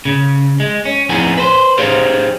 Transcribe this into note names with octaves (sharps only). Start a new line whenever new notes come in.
C#3
G#3
C#4
F2 B3 D#4 E4 G#4 G#5
B4 C5
D#4 G4 G#4 C5 C#5 F5